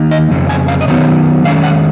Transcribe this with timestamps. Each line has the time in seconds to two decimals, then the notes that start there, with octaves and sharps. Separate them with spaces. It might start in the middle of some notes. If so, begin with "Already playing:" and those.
Already playing: D#3 A#3 D#4
0.11 D#5
0.31 F2 C#3
0.49 G#5
0.68 F5
0.81 D#5
0.88 D#3 F#3 B3 D#4 C#5
1.44 D#3 G#3 C#4 F5
1.63 F#5